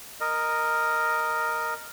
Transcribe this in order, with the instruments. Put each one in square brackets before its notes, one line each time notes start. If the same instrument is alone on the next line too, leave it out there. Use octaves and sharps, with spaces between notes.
[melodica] A#4 D#5